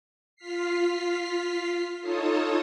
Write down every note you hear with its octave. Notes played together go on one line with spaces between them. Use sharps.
F4 F6 B6 C7
D#4 F4 A4 C#5 A5 D#6